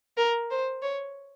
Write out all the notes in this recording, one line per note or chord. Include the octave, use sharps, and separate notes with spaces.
A#4
C5
C#5